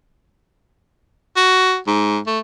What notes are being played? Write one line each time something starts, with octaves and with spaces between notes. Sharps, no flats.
F#4
G#2
A3